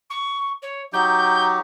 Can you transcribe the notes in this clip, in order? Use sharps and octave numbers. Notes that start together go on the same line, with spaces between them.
C#6
C#5
F#3 D#4 G4 G6